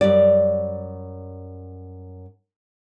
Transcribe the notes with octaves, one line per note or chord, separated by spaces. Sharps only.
F#2 G3 D5